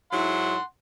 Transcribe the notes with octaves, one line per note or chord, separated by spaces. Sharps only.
G#2 F#3 E4 F#5 C6